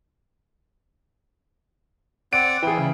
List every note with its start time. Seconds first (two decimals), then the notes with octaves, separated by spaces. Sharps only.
2.33 C4 D5 F#5 D7
2.63 E3 E4 G#4 G5
2.78 C#3